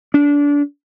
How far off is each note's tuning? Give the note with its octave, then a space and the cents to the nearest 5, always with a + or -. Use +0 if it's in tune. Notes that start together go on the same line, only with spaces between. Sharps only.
D4 -25